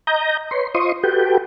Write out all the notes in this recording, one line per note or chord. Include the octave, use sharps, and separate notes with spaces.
D#5 A#5 G6
B4 C#5 C6
F4 C5 D#5 C6 C#6 D#6
F#4 G4 A4 B4 G5